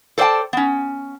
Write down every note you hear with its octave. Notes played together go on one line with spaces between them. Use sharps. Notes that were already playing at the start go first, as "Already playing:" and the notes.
A4 C5 D5 E5 G5 A5
B3 C#4